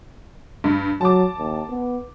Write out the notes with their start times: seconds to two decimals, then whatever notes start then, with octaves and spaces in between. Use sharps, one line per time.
0.64 G2
1.01 F#3 A5 D6
1.38 D#2
1.69 B3